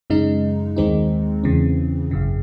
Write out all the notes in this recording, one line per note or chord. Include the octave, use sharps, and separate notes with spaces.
F#2 C#3 G#3 D#4
D#2 D#3 G#3 C4 D#4
E2 C#3 E3 C4
G#1 F#2 C#3